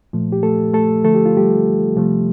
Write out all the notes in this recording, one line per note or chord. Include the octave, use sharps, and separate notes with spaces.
A#2 F3 A3
G4
A3 A4
A3 A4
D3 F3 A3 A4
G4
F4
G3 G4
C3 F3 A3